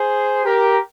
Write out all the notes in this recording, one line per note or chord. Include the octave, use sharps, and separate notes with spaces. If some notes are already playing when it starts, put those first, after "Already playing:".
Already playing: G#4 C5
G4 A#4